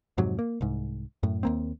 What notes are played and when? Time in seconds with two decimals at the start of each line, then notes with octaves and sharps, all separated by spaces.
0.18 F2 G#2 C3 F#3
0.39 A#3
0.61 C2 G#2
1.23 F#2 A2
1.43 D#2 A#3 C4